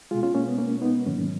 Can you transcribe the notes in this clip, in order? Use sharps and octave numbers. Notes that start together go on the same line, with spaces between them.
B2 G#3 F4 G#4
C#4 F4
A#3 C#4
B3
A#3 C#4
B3 D#4
G#2 D#3 F#3 A#3 C#4